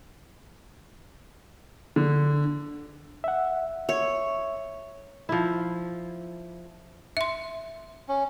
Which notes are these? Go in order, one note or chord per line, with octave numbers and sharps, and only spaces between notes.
D3
E5 F#5
C#5 E5
F3 E4
E5 C6
C#4